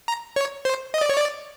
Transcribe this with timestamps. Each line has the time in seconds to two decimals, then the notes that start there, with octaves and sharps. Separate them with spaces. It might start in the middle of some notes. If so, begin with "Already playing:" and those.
0.08 A#5
0.36 C#5
0.65 C5
0.94 D#5
1.01 D5
1.09 C#5
1.17 D5